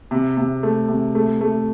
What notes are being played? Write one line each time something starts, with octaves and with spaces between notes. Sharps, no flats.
C3
C3
A3
C3
A3
A3